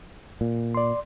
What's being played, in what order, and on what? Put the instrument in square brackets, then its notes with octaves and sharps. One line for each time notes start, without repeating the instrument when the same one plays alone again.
[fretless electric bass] A#2
[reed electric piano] D5 C6